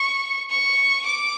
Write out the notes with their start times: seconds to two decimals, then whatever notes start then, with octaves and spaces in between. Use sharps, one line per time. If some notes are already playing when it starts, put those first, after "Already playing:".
Already playing: C#6
0.51 C#6
1.05 D6